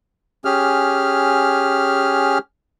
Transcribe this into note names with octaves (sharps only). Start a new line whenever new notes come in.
C#4 G4 G#4 F6